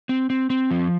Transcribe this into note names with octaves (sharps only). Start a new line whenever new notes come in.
C4
C4
C4
F3